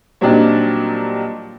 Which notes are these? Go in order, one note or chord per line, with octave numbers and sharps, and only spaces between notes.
A#2 F#3 G3 C4 D4 D#4